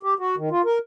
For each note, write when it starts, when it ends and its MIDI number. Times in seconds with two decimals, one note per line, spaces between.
0.03 0.14 67
0.19 0.35 66
0.37 0.49 51
0.51 0.62 65
0.65 0.79 70